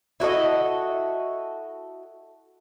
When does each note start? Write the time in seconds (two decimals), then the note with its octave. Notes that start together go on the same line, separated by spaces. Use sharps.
0.20 E4 F#4 A4 D#5